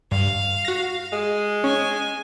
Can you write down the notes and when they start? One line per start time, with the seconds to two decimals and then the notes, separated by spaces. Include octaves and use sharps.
0.12 G2 F5
0.65 F#4 A#6
1.13 G#3
1.64 C#4 G#5